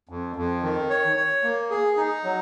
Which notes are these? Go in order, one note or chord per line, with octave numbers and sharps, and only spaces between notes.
F2
F2
D#3
C#5
C#5
A#3
G#4
D#4
F#3